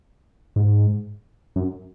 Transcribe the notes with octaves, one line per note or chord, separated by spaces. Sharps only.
G#2
F#2